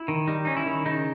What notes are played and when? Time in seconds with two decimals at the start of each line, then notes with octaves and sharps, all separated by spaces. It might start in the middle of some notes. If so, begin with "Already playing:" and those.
Already playing: E4
0.08 D#3
0.28 G3 D#4
0.45 C#4 D#4
0.57 E4
0.66 D#3
0.85 C#3 D#4